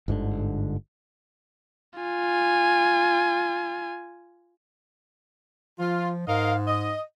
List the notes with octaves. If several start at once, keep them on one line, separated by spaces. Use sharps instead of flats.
G1 G#2 B2 D3
F4 G#5
F3 F4
G#2 A#4 D#5 F5
D#5